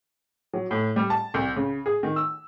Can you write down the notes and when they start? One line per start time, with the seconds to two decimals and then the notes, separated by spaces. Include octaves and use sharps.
0.54 F#3
0.71 A2
0.96 G3
1.10 A5
1.34 C2
1.56 C#3
1.86 G#4
2.03 D#3
2.16 E6